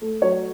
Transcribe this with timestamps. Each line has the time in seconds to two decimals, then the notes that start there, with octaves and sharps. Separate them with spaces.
0.01 A3
0.22 F#3 C#5